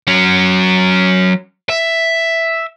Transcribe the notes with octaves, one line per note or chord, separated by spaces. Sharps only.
F#3 C#4
E5